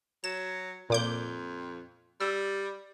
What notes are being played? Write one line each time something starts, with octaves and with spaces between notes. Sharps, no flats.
F#3 E7
F2 A#2 D6 G6
G3 E6